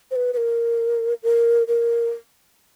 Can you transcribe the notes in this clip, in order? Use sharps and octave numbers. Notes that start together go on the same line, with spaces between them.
C5
B4
B4
A#4
A#4
A#4